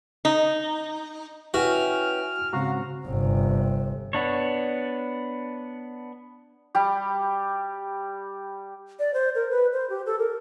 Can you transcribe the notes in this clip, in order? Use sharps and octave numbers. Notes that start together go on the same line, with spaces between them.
D#4
C#4 E4 F#4 B4 E5 G5 F6
G#2 C#3 C4 F#4 F5 A#5
G1 C3
B3 D4 C#5
G3 G4
D5
C5
A#4
B4
C5
G4
A4
A#4